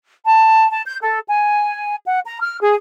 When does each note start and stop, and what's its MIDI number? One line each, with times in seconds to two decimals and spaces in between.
0.26 0.68 81
0.70 0.82 81
0.86 0.98 91
1.01 1.20 69
1.27 1.96 80
2.06 2.19 78
2.26 2.39 82
2.41 2.58 89
2.61 2.75 68